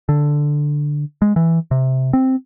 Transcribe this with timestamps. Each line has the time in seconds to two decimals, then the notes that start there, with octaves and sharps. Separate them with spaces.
0.09 D3
1.22 G#3
1.36 E3
1.71 C3
2.13 C4